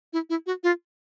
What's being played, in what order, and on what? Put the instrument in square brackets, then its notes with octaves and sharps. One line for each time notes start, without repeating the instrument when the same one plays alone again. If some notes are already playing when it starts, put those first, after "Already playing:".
[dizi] E4
E4
F#4
F4